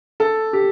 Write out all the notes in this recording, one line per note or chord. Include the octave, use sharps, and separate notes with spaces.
A4
G4